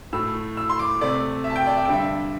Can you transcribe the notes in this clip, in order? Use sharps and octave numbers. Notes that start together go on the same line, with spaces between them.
A2 A3 E6
E6
C6
D6
C3 A3 D5
E5
A5
G5
D5
E5
G5
G2 D3 G3 E5